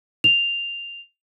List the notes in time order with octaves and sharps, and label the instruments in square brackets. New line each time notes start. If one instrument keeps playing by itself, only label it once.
[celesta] F7